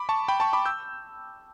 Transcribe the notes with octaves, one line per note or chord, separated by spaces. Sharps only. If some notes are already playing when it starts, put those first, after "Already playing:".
Already playing: B5 D6
A5 C#6
G5 B5
A5 C#6
B5 D6
E6 G6